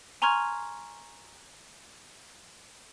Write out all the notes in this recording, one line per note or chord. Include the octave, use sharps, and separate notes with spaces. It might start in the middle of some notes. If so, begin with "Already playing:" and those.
G#5 A#5 C6 C#6 F6 G#6